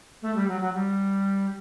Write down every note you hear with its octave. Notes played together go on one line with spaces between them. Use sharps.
A3
G3
F#3
F#3
G3